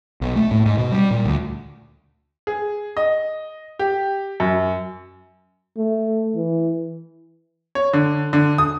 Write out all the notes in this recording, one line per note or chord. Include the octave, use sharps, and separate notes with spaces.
B1
A3
A2
G#2
B2
G3
A#2
D2
G#4
D#5
G4
F#2
A3
E3
C#5
D3
D3
D#6